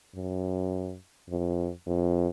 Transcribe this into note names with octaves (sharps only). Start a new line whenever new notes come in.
F#2
F2
F2